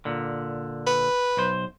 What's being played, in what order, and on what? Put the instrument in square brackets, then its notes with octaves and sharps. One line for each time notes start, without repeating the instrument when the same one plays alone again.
[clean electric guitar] A#2 D3
[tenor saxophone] B4
[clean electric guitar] B1 C5